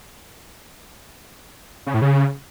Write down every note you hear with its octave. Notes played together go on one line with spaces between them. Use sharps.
C#3
A2
C#3